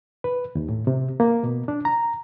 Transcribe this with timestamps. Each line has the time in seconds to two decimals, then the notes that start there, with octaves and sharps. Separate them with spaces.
0.24 B4
0.55 D#2
0.69 A2
0.87 C3
1.20 A#3
1.43 B2
1.68 D4
1.85 A#5